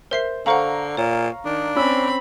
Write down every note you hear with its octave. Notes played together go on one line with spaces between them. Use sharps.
A#4 C5 E5 C7
D3 A4 C5 F5 F#5 A#5 C#6
A#2 C#5
D#3 D4
C4 C#4 B5 E6